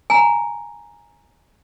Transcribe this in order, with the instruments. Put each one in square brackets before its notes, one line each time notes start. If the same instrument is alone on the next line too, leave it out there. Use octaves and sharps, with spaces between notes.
[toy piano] G#5 A#5